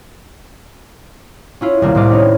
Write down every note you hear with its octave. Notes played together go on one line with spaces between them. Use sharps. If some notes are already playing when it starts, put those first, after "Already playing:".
C#4 E4 F4
D#1 C2 A#3
C2 A2 C5 D#5 D6 F6
C4 C#4 D#4